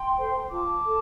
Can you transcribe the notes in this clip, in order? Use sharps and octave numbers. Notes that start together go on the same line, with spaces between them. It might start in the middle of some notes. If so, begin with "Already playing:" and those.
Already playing: G5 C6
A4 C5
F4 A5 D6
A4